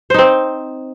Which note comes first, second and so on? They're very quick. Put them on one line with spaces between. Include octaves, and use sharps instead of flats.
C5 D#4 C4